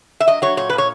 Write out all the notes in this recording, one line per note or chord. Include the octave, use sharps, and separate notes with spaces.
E5
F#3 D#5
F#3 C#5
A#2 C#5
A#2 B4
C#5